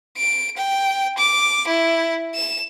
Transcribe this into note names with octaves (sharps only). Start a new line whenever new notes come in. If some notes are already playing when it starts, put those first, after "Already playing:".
D7
G5
D6
E4
E7